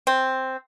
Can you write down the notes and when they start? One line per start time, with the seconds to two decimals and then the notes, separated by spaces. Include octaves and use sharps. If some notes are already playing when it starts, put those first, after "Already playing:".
0.07 C4